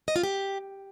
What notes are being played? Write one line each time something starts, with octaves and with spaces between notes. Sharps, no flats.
D#5
F4
G4